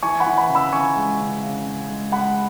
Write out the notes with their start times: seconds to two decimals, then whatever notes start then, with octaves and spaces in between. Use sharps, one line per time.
0.03 E3 G#5 C#6
0.20 F#5 B5
0.26 E3
0.38 F#5 B5
0.49 C#3
0.55 B5 E6
0.73 C#3 G#5 C#6
0.96 G#3
1.19 C#3
1.43 C#3
1.66 C#3
1.89 G#3
2.12 G#3 F#5 B5